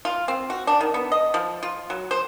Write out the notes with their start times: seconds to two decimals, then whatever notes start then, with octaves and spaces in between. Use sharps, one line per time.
0.05 F4
0.28 C4
0.50 F#4
0.67 D4
0.81 D#3
0.94 B3
1.12 D#5
1.34 F3
1.63 F4
1.90 F#3
2.11 C5